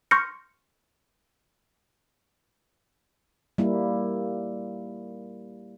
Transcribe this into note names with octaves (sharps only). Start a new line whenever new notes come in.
C6 C#6 F6 G6 A#6 C#7
G3 A#3 E4